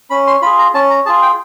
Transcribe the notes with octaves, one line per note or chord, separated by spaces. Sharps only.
C#4 B5
C6
F4 G#4 B5
A#5
C#4 A5
A#5
F4 G#4 A5
G5